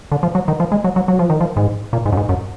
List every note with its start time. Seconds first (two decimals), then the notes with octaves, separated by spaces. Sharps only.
0.12 D3
0.23 F3
0.35 F#3
0.48 D#3
0.60 F3
0.72 G#3
0.84 F#3
0.96 F#3
1.08 F#3
1.19 F3
1.30 D#3
1.41 F3
1.57 G#2
1.93 A#2
2.05 G#2
2.12 F#2
2.17 G#2
2.29 F#2